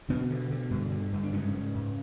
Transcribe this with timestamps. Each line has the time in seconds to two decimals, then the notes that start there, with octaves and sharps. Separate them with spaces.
0.09 B2 D3 B3
0.30 D3
0.51 D3
0.71 G2
0.91 D3
1.12 G2
1.23 D4
1.33 G#2 C#3 C#4
1.54 G#2
1.75 G#2